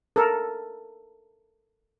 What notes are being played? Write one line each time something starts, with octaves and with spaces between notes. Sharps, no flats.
A4 A#4